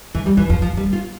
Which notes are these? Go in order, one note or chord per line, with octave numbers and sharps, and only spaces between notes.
F2 E3
E2 G3
F2 E3
F2 F3
F2 F3
F2
G3
F2
F4